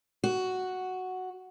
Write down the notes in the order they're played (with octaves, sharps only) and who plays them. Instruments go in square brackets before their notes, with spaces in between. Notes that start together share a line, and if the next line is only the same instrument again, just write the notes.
[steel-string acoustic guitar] F#4